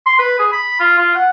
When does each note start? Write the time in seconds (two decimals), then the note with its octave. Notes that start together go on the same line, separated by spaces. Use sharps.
0.06 C6
0.19 B4
0.39 G#4
0.52 B5
0.80 F4
0.98 F4
1.15 F#5